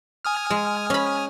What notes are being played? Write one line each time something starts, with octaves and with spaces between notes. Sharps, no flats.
G#5 D#6 F6
G#3
C#4 B5